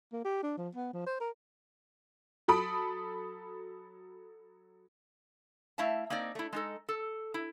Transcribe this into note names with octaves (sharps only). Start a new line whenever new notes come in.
A#3
G4
D4
F3
B3
F3
C5
A#4
F#3 A4 B5 D#6 D7
A3 E4 E5 F5 A5
A#3 C4 D#4 D5
A3 E4
G#3 D#4 A4
A4
E4